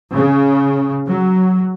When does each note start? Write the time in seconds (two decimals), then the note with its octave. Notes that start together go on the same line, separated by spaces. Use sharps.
0.14 C#3
1.07 F#3